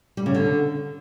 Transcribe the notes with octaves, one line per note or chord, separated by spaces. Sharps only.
G3
C#3
D3